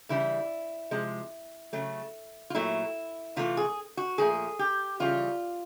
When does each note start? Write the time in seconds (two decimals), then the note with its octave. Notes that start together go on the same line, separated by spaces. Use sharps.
0.09 C#3 E3 G3 E4
0.91 C3 F3 G#3
1.73 C#3 F#3 A3
2.50 F4
2.55 A#2 F#3 A3 E4
3.36 C3 E3 A3 F4
3.57 G#4
3.97 F#4
4.18 A#2 F3 A3 G#4
4.59 G4
5.00 C#3 E3 G3 F4